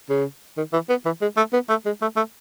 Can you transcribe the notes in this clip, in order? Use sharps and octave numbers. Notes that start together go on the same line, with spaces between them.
C#3
D#3
E3
B3
E3
G#3
A3
B3
A3
G#3
A3
A3